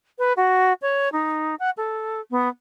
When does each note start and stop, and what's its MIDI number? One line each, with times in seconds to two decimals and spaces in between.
0.19 0.33 71
0.37 0.73 66
0.82 1.12 73
1.12 1.55 63
1.59 1.70 78
1.77 2.21 69
2.31 2.48 59